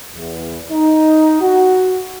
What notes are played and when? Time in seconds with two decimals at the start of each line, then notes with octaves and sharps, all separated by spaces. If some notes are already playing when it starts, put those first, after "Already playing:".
0.16 E2
0.71 D#4
1.41 F#4